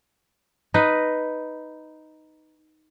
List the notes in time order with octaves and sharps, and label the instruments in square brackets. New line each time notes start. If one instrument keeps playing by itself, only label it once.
[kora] D#4 B4 D#5